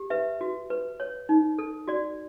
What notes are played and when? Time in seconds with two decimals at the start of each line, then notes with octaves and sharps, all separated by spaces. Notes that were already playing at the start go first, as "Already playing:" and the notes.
Already playing: G4
0.10 B4 E5
0.41 F#4
0.70 B4
1.00 C#5
1.29 D#4
1.59 A4
1.88 F#4 D5